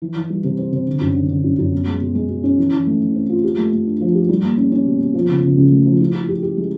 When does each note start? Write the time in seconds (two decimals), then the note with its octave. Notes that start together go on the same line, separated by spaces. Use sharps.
0.02 E3
0.16 E3
0.30 G3
0.44 C3
0.58 C4
0.72 C3
0.87 D3
1.01 F#2
1.15 D3
1.29 D3
1.44 F#2
1.58 F#2
1.72 B2
1.87 G#3
2.01 B2
2.15 G#3
2.29 B2
2.44 C#4
2.58 E3
2.72 E3
2.87 A3
3.01 E3
3.15 C4
3.29 F4
3.44 G4
3.58 A3
3.72 A3
3.86 D4
4.01 F3
4.15 G4
4.29 G3
4.43 A#3
4.57 C#4
4.72 C#4
4.86 B2
5.00 B2
5.14 F3
5.29 C#3
5.43 C#3
5.57 C#2
5.71 A3
5.86 F3
6.00 E4
6.14 E4
6.29 G4
6.43 G4
6.57 G#3